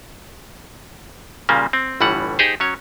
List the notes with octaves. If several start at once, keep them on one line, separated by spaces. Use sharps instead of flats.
A#2 C#3 G3 A#3
C4
G1 A2 E3 G3 F#5
D#4 G4 G#4 C5
F#3 C#4 C#5